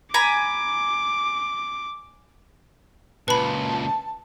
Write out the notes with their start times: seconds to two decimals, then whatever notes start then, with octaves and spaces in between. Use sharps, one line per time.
0.14 G#5 A#5 B5 D6
3.28 C#2 A#2 B4 A5 B5